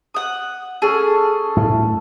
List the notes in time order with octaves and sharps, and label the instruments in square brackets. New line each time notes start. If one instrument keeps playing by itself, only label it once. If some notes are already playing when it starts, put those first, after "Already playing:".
[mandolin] F#5 D#6
[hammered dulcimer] C#4 A4 [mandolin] G#4
[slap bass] A2 A3